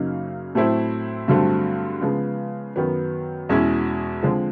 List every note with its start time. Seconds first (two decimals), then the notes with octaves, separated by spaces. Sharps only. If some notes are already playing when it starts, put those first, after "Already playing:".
Already playing: F#2 C#3 F#3 A#3 D#4
0.55 A2 F#3 A3 C4 E4
1.28 G2 D3 F#3 A3 C4
2.01 C#3 F3 G#3 B3
2.76 F#2 D#3 F#3 B3
3.49 E2 B2 G#3 C#4 E4
4.23 D3 F3 G#3 C4